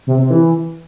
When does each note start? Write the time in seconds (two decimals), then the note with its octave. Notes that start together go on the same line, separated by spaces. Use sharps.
0.07 C3
0.19 C3
0.30 E3